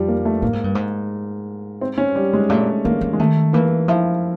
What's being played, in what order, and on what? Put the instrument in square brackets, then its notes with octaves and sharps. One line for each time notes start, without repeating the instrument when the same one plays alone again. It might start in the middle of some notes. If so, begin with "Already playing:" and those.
Already playing: [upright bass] F2 [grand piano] F3 G3
[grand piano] A#3
A3
[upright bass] A2 [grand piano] A#3
[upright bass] G#2
G2
G#2
[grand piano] C4
C#4
G3
G#3
[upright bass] A#2 [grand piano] A3
[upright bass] E3 [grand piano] A#3
[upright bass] E3
[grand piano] G#3
[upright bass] D#3 [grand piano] A3
[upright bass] E3 [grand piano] A#3
[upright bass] F3 [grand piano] E4